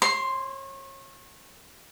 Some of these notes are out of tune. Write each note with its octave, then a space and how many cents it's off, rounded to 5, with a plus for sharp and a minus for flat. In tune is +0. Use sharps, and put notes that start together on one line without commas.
C#5 -35 C6 +0